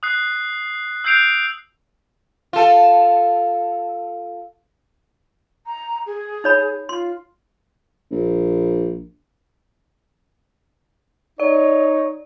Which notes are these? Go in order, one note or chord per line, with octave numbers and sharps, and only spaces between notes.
D#6 F#6 C7
E6 F#6 G6 C7 D7 F7
F4 A4
A#5
G#4
D#4 C#5 B5
F4 C6
A#1
D#4 C#5 D5